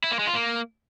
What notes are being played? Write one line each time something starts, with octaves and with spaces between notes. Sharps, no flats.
E4
A#3
G#3
F4
A#3